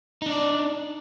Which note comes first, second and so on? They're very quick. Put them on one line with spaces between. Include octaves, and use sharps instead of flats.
D#4 D4 D5